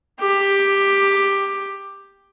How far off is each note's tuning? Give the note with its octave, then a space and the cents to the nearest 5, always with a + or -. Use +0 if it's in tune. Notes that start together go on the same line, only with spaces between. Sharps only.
G4 +10